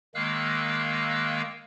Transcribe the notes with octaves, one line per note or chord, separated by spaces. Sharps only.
D#3 G#3 A#3 F5 E6 F#6